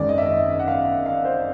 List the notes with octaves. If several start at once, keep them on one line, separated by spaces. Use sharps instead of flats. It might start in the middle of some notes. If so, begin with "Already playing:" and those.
Already playing: G#1 F#2 D#3 G#3 D5
D#5
E5
D#5
F#5
F5
F5
C5